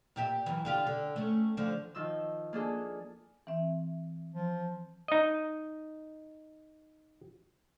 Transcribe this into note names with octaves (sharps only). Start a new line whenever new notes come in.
A#2 G4 E5
F#2 E3
D3 F4 G4
D3
A3 C#4
D3 F3
D#3 F3 E6
A#3 D4 G#4 A4
E3 C4 E5
F3
D#4 D#5